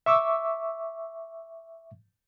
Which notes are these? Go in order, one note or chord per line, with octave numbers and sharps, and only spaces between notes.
E5 C#6 D6 E6